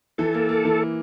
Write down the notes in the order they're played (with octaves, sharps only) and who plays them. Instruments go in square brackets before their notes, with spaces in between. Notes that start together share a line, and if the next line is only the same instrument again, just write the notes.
[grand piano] E3 [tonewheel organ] A4
[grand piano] A#3
A#3
E3